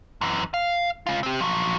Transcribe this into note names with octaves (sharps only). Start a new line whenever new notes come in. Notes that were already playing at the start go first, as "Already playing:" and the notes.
F#2 E3
F5
C#3 F4
C4 G4
F3 F#3